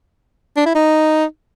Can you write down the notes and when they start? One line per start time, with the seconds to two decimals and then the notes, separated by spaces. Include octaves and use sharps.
0.57 D4
0.66 E4
0.75 D#4